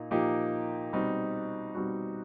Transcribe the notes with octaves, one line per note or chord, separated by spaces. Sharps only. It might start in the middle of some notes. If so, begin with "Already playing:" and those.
Already playing: A#2 A#3 D#4
A#2 F3 A#3 D#4 G4
B2 G3 C4 D#4 F#4
B2 G3 C4 D#4 F#4